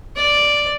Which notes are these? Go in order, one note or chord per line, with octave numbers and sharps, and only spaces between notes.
D5